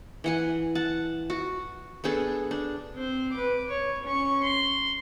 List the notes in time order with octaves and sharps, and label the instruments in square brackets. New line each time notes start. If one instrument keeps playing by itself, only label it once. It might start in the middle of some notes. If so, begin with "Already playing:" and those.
[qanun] E3 F#5 G#5
F#5 A5
F#4
B3 D4 G#4 A4
D4
[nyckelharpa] C4 C5
B4 D6
C#5
C#4 C#6
C6